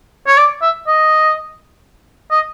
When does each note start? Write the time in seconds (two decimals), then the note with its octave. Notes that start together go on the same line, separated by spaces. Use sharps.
0.28 C#5
0.37 D5
0.62 E5
0.87 D#5
2.31 D#5